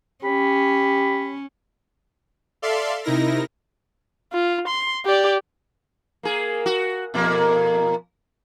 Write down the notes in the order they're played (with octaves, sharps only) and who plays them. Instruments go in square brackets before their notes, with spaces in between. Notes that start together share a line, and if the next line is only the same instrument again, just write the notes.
[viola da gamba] C#4 [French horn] G4 [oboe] B5
[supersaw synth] A4 D5 E5 F5 C6
C3 D#4 E4 A#4 A#6
[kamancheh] F4
C6
G4 D5
[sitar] A#3 G#4
F#4
F2 B2 A#3